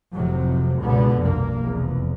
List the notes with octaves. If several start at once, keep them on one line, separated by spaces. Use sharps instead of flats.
F1 F2 A2 C3 F#3
C#2 G2 B2 D3 B3
F1 B1 G2 A#3
F1 E2